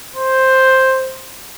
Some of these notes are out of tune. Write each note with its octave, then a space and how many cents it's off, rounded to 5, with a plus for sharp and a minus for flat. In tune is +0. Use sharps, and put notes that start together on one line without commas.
C5 +5